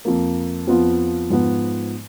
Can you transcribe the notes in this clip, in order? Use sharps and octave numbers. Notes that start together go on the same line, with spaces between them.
F2 F3 A#3
F2 F3 B3 F4
G#2 F3 B3